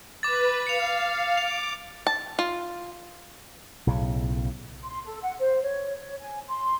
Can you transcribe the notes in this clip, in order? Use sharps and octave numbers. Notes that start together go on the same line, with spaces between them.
B4 D6 A6
F5 C#7 F7
D6 F7
A5
F4
B1 A2 C#3
C6
A4
F#5
C5
C#5
C#5
G#5
C6